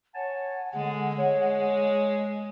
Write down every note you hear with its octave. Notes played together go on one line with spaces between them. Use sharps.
C#5 F#5 G#5 A5
D3 G#3
G#3 C#5